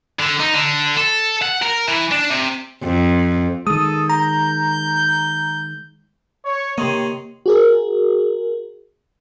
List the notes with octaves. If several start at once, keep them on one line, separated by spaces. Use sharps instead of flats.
D3
D#4
D3
A4
F#5
A#4
E3
D4
C3
F2
D#3 G#3 A4 D#6
A#5 G6
C#5
C3 D#3 A#3 C#5 D#5 C6
F#4 G#4 A#4